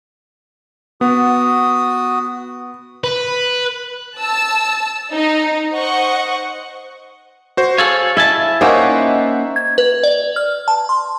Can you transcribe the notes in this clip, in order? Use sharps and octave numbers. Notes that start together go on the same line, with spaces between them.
B3 F#4 D#6
B4
A5 E6
D#4
C5 D#5 F#5 C#6
F#4 C5
G#4 A4 C#5 F5
E4 E5 G#5 A5
A#3 C#4 D#4 C5 E5 F#5
G#6
B4
D5
F6
A5
C6